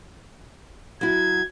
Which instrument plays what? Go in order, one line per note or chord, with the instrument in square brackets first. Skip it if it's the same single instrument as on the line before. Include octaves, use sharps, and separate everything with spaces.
[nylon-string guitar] F#3 E4 [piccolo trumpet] G#6